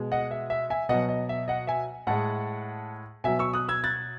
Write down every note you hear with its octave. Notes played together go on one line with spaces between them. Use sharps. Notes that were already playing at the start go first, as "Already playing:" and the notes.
Already playing: B2 G#3
D#5 F#5
E5
E5
E5 G#5
B2 F#3 D#5 F#5
D#5
E5
D#5 F#5
E5 G#5
A2 G#3 F#5 A5
B2 F#3 E5 G#5
C#6 E6
D#6 F#6
E6 G#6
F#6 A6